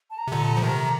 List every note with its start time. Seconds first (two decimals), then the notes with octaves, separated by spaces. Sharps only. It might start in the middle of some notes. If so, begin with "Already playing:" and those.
0.10 A5
0.18 A#5
0.27 C3
0.32 A#2 D3 A#5
0.43 A5
0.53 F3 A#5
0.62 C3 D#3